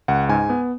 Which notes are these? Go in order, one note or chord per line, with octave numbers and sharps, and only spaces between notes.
C#2 F#5
G#2 G#5
B3